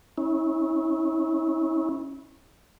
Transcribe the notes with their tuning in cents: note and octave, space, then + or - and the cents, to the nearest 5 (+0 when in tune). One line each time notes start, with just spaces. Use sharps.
C#4 -15 E4 -35